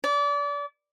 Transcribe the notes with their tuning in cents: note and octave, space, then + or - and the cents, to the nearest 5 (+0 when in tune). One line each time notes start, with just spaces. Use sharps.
D5 -30